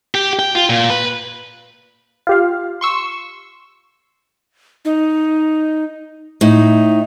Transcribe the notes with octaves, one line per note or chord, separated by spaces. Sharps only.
G4
G5
F4
A#2
B4
F4 G4 F5
C6 C#6 E6
D#4
A2 D#4